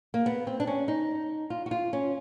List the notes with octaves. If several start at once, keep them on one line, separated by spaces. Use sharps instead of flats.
A#3
B3
C4
D4
C#4
D#4
F4
F#4
F4
C#4